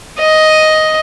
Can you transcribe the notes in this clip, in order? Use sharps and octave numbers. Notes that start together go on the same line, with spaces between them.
D#5